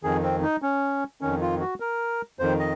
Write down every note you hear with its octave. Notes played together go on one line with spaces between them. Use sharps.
F2 D#3 G#4
C4
D#4
C#4
F2 D#3 C#4
F4
F#4
A#4
F2 D#3 C5
D#5